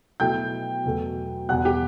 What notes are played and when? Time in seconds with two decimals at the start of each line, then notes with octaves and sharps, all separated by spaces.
0.20 B2 F#3 A3 E4 G5 G6
0.84 E2 B2 F#3 A3
1.49 E2 B2 G3 B3 F#5 F#6
1.65 G4 G5